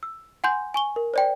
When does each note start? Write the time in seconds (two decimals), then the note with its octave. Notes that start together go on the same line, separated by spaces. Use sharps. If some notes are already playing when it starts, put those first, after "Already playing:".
0.03 E6
0.44 F#5 G#5 C6 G6
0.74 G#5 C#6 G7
0.96 A#4
1.14 C5 D5 G5